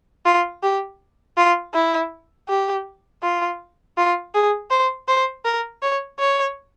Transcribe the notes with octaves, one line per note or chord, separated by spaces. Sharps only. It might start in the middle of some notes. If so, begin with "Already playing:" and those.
F4
G4
F4
E4
G4
F4
F4
G#4
C5
C5
A#4
C#5
C#5